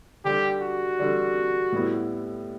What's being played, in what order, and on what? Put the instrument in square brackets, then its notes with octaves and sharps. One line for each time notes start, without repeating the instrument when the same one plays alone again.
[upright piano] D3 G3 D4 [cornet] G4
[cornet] F#4
[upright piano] D3 G3 D4
A2 G3 B3 E4